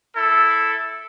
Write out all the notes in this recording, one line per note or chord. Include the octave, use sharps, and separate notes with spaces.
E4 A4